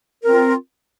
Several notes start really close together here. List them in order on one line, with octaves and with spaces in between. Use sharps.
A#4 C4 F4